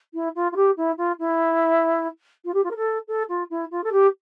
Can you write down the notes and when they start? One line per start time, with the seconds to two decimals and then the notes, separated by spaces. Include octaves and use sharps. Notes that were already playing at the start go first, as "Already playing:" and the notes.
0.14 E4
0.36 F4
0.52 F4
0.56 G4
0.77 E4
0.98 F4
1.19 E4
2.45 F4
2.54 G4
2.64 F4
2.71 A#4
2.77 A4
3.08 A4
3.29 F4
3.50 E4
3.71 F4
3.84 A4
3.92 G4